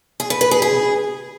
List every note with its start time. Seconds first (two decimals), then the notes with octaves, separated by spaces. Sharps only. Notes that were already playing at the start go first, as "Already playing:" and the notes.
0.20 G#4
0.30 B4
0.41 B4
0.51 G#4
0.62 G#4